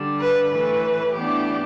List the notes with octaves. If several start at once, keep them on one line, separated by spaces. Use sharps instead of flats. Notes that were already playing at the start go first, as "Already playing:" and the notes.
Already playing: D3 G3 D4
B4
A2 E3 A3 B4
A2 E3 B3 D4 G4